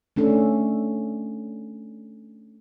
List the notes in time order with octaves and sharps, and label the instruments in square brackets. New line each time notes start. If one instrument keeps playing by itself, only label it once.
[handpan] A3 C#4 D4 A4